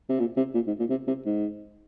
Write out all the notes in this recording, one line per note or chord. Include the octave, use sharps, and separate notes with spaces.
C3
A#2
C3
A#2
G#2
A#2
C3
C3
G#2